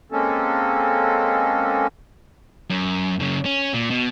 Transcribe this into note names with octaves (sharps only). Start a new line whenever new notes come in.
G#3 A#3 C4 C#4 A4
F#2
F#2 C#3
C#4
A#2
B2